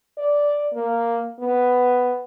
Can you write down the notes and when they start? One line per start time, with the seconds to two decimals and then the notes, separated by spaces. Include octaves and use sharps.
0.18 D5
0.73 A#3
1.39 B3